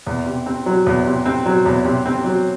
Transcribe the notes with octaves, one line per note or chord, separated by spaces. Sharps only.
E2
C3
C4
F#3
E2
C3
C4
F#3
E2
C3
C4
F#3